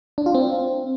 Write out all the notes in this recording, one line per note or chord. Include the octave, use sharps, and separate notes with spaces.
D4
F4
C4